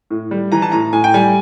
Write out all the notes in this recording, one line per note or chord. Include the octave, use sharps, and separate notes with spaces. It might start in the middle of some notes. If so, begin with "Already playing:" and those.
A2
G3
E3 A#5
A5
A2 A#5
A2 G#5
G5
G3 G#5